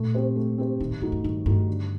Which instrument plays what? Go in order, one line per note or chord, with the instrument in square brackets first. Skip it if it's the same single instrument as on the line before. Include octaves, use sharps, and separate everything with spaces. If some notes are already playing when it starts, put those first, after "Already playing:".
Already playing: [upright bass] A#2 [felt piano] A3
[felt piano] C4 G4 C5
A3
C4 G4 C5
[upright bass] A#2 [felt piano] D#3
[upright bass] A2
[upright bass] G2 [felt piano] A3 D#4 F#4
[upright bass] G2
[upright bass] G2 [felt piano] D#3
[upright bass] G2 [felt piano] A3 D#4 F#4
[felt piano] D3